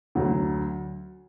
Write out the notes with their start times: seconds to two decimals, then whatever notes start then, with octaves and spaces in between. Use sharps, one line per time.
0.15 D2 D3 F#3